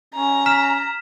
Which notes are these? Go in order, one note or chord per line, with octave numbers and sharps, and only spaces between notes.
C#4 A#5
F6 B6 E7